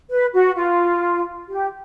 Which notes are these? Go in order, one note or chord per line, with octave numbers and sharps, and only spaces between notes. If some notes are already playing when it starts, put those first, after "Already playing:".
B4
F#4
F4
G4